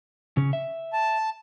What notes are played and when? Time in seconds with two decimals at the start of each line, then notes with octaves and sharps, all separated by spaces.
0.37 C#3 C#4
0.53 E5
0.93 A5